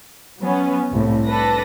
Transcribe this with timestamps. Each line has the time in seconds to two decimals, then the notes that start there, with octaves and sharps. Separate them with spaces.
0.39 F#3 B3 C#4
0.92 C2 A2
1.26 D4 A4 B4 A#6